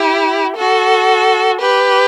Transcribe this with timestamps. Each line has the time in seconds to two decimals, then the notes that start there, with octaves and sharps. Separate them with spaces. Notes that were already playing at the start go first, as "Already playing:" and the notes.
Already playing: E4 G4
0.56 F#4 A4
1.61 G4 B4